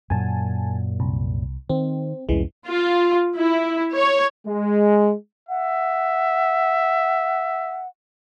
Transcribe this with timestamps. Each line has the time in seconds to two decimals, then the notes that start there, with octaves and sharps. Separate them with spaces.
0.10 F#2 A#2 F#3 G#5 A5
1.00 C2
1.69 D#3 C4
2.29 C2 F2 E3 G#3 C#4
2.67 F4
3.37 E4
3.94 C#5
4.47 G#3
5.49 E5 F#5